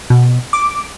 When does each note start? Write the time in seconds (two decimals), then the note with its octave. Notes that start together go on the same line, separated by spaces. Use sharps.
0.10 B2
0.53 D6